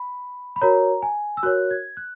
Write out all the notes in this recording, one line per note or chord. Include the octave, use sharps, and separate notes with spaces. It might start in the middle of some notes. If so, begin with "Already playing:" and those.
Already playing: B5
B5
F#4 A#4 C#5 A#5
G#5
E6
F#4 A#4 C#5 F#6
G#6
F#6